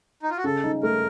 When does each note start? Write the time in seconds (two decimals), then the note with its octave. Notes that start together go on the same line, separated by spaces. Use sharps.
0.23 D#4
0.30 F4
0.37 F#4
0.44 C#3 A4
0.64 D#4
0.83 A3 A#4